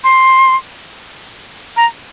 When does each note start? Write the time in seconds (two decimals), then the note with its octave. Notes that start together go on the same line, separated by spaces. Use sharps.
0.04 C6
1.77 A#5